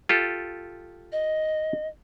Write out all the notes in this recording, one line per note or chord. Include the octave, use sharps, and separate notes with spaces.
F4 G4 A4
D#5